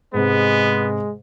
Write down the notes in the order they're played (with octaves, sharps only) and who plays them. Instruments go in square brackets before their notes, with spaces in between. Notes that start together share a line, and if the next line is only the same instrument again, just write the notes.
[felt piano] G#2 C3 [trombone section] G#3 [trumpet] B3